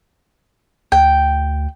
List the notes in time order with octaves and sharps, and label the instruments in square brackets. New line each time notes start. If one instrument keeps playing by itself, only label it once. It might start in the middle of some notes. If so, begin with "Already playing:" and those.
[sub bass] D2 [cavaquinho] G5